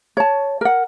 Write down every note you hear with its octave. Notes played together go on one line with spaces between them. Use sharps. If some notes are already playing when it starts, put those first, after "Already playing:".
C#5 A5
A#4 F#5